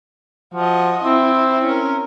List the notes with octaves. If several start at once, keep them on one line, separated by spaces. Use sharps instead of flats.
F3 F#4 D#5
C4 E4
C#4 A#4